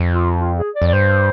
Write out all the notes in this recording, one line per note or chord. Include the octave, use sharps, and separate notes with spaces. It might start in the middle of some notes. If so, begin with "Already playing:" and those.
Already playing: F2
F4
F4
G#4
D5
F2
D5
G2 C5